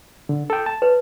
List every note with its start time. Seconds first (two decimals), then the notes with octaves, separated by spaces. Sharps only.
0.29 D3
0.50 A4 G5
0.66 A5
0.82 B4